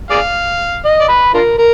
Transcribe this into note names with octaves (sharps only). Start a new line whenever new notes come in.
G#4 D5 F5
D#5
D5
B4
D4 F4 A#4
A#4